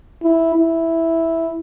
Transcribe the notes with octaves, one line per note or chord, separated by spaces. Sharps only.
E4
E4